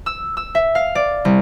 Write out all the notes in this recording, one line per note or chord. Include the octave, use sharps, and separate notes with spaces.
E6
E6
E5
F5
D5
C2